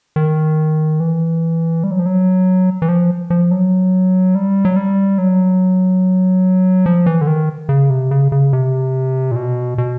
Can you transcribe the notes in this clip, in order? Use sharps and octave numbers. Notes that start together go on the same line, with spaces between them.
D#3
E3
G3
F#3
F3
F#3
E3
F3
F3
F#3
G3
F#3
G3
F#3
F3
E3
D3
D#3
C#3
C3
C#3
C#3
C3
A#2
B2
B2